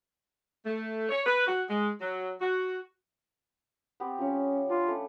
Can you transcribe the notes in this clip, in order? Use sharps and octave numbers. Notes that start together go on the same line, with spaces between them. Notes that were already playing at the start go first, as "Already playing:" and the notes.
A3
C#5
B4
F#4
G#3
F#3
F#4
B3 C4 G4
F3 C#4 C#5
D4 F4
A3 C#4